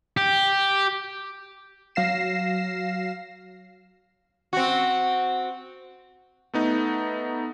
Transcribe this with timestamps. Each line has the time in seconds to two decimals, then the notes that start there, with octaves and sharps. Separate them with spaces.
0.17 G4
1.95 F#3 F5 A#6 C7 E7
4.53 C4 F#4
6.54 A3 B3 D#4